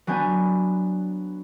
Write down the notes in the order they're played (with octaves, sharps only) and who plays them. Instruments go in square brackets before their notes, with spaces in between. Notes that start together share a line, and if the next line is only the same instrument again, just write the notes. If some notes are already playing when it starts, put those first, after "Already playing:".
[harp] F#3 B3 D4 G#5 G6